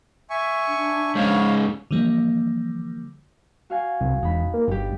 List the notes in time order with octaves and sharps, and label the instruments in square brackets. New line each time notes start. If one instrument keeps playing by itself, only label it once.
[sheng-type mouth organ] E5 G#5 C#6
[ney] D4
[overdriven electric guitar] G#2 C#3 [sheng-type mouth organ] C#5 F5
[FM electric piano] D3 E3 F3 G3 A#3
[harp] F#4 F5 G#5
[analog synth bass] C2
[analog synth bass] E1 [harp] D#4 B5
[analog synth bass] A#3
[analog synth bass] G1 [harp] G3 G4